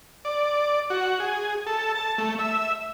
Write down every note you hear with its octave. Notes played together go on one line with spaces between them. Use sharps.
D5
F#4
G#4
A4
A5
A3
E5